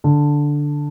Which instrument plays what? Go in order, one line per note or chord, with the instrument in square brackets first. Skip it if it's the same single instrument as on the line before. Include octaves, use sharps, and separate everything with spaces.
[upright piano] D3